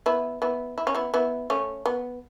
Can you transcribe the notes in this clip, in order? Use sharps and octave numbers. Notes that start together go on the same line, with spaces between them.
B3 E4
B3 E4
E4
C#4
B3 E4
B3 E4
A3 C#4
B3